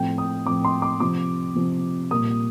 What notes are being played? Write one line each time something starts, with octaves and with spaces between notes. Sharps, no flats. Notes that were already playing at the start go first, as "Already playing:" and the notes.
Already playing: A2 F3 C4 G5
D#6
A2 F3 C4 D6
C6
D6
C3 F3 C4 D6
C3 F3 C4
A#2 G3 A#3 D#6